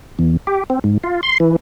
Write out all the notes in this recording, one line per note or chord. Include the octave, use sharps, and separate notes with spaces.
E2
G4
C4
G#2
F4
C6
E3